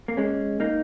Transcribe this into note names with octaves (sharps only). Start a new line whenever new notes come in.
A#3
G#3 C#4
A#3 D#4